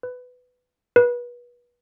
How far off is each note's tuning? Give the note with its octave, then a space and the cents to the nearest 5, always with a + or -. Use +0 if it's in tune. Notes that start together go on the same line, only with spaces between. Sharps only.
B4 +15
B4 -30